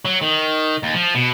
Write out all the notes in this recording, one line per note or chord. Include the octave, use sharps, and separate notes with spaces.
F#3
D#3
D#2
F3
B2